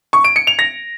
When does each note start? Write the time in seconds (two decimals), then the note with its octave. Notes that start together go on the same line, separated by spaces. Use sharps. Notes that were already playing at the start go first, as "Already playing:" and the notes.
0.13 C#6
0.24 D7
0.36 C#7
0.47 F7
0.59 A#6